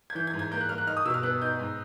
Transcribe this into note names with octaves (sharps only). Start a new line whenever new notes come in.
G#6
E3 G6
G#6
G#2
G#6
A#3 G6
F#6
A#3 F6
F#6
D#4 F6
D#6
B2 E6
F6
B3 F#6
D#4 G6
G#2